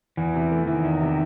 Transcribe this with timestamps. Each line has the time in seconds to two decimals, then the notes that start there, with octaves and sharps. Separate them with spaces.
0.17 E2 E3
0.35 C3
0.51 A3
0.67 D#3 E3
0.84 E2
1.01 C3